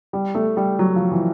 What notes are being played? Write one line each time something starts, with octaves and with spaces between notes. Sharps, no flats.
G3
A3
G3
F#3
F3
E3